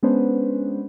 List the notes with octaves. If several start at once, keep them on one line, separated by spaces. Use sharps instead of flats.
G#3 B3 C#4 D4 B4 C5